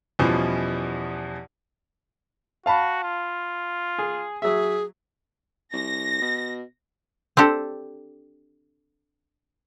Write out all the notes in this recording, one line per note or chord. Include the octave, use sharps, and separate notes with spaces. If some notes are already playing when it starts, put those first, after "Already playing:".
E2 B2 E3 F3 G3 C#4
F#4 F5 A5 B5
F4
G#4
F#3 G#4 E5
C2 A#6
B2
C4 D4 G4 A4